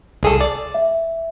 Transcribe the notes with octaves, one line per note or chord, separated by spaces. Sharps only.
C2 G#4 A4
D5
E5